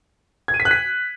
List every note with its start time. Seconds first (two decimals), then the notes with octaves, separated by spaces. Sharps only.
0.48 G#6
0.54 D#7
0.60 B6
0.65 F#6
0.71 B6